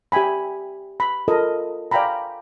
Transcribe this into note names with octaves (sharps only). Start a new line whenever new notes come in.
G4 E5 G5 G#5 B5
B5
F4 A4 A#4 D#5
D5 F5 G5 G#5 A#5 B5